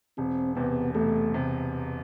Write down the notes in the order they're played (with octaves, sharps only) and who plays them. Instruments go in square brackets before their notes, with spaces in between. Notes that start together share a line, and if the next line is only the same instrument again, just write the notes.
[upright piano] E1 [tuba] C4
[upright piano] E2 C3 [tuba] B3
[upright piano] E1 [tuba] A3
[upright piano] C3